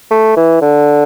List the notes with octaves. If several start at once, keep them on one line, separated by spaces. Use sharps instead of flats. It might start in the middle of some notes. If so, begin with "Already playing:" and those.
A3
E3
D3